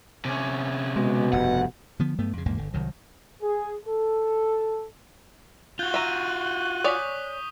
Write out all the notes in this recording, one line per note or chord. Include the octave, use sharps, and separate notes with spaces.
C3 C#4
B2 G#3
F1 G2 F#5
D3 F3 B3
G2 F#3 A3 B3
F2 C#3
A#1 E2 G#2 A#3
G1 D3
C2 D#3 F#3
G#4
A4
F4 F#4 F#6 G6 G7
E5 A#5 C#6 D#7
C#5 D5 G#5 D#6 B6